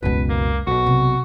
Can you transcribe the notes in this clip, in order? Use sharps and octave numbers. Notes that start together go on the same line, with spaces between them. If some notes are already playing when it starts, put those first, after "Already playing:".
F#1 C#2 B2 G#3 B4
A#3
B1 B2 F#4
C3